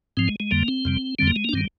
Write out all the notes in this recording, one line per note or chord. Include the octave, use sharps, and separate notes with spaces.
G#2 F3 C4
G#3
G#3
F2 D3 G3 A#3
C4
F2 C3 G3
F2 D3 G3 C4
A#3
G#3
A#3
D4
G2 D#3 G3 C4